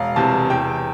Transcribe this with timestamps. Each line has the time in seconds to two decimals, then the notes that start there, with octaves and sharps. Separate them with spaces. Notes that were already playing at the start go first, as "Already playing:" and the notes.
Already playing: E1 F5
0.16 E2 C3 A5
0.50 E2 G5